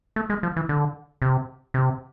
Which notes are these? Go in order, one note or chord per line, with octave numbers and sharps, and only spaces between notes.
A3
G#3
F3
E3
D3
C3
C3